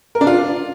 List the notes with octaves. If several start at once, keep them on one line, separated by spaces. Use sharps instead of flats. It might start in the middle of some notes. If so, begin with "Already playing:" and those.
A#4
D4
F4